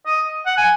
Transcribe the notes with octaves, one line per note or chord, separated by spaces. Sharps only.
D#5
F#5
G#5